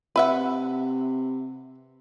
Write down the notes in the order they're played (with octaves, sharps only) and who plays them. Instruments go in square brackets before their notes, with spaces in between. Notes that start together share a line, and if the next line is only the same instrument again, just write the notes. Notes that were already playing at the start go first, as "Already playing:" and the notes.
[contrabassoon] C3 [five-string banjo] B4 E5 F#5